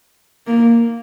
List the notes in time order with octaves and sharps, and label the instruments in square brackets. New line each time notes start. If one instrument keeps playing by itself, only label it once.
[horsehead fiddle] A#3